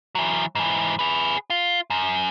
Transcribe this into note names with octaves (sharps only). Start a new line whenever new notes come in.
E3 F#3
G#2 E3
G#4 B4
F4
F#2